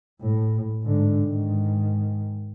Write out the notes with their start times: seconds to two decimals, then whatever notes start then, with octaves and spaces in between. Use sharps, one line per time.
0.21 A2
0.83 G#2 D3
1.24 G#2 D#3